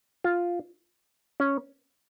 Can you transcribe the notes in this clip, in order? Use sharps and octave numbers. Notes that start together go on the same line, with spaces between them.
F4
C#4